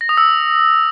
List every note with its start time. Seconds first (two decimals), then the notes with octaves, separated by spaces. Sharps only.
0.01 A#6
0.09 D#6
0.17 E6